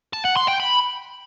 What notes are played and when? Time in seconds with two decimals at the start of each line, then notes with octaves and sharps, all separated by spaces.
0.13 A5
0.25 F#5
0.36 C6
0.48 G5
0.60 B5